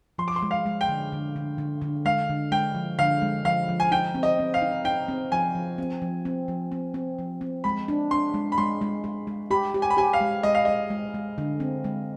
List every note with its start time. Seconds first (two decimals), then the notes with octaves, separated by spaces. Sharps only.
0.18 F3 C6
0.28 D6
0.36 C6
0.42 G#3
0.51 F5
0.66 G#3
0.81 G5
0.89 D3
1.12 D3
1.36 D3
1.58 D3
1.82 D3
2.05 G#3 F5
2.29 D3
2.51 G#3 G5
2.75 F3
2.99 D3 F5
3.22 G#3
3.45 F3 F5
3.69 F3
3.80 G#5
3.91 D#4 G5
4.14 C4
4.23 D#5
4.39 C4
4.54 F5
4.62 D#4
4.85 D#4 G5
5.08 C4
5.32 F3 G#5
5.55 F3
5.78 C4
6.02 F3
6.25 C4
6.48 F3
6.72 C4
6.94 C4
7.19 F3
7.41 C4
7.64 G#3 B5
7.88 D4
8.11 D4 C6
8.34 G#3
8.52 B5
8.58 G#3 C6
8.81 G#3
9.04 G#3
9.27 G#3
9.51 G4 B5
9.74 G4
9.82 G#5
9.90 B5
9.97 G4 G#5
10.13 F5
10.20 G#3
10.43 G#3 D#5
10.55 F5
10.65 G#3 D#5
10.90 G#3
11.14 G#3
11.38 D3
11.60 C4
11.84 G#3